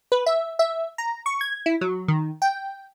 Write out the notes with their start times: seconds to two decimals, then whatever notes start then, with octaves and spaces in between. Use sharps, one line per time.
0.12 B4
0.26 E5
0.59 E5
0.98 A#5
1.26 C#6
1.41 G#6
1.66 E4
1.81 F#3
2.08 D#3
2.42 G5